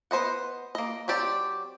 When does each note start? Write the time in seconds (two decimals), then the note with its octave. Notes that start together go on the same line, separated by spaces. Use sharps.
0.11 B3 C5 D#5 F#5
0.75 A#3 D#5
1.08 F#3 C4 G4 D5